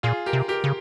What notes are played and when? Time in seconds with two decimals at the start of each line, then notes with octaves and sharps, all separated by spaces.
0.03 A#2 F4 G#4
0.26 G4 A#4
0.33 C3
0.48 G4 A#4
0.64 C#3